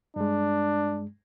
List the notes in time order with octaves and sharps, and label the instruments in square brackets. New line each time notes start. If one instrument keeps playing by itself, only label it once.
[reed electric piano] G2 G#3 [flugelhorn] D4